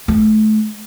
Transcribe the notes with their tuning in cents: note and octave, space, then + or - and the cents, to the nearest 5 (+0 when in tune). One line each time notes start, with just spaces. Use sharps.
A3 -35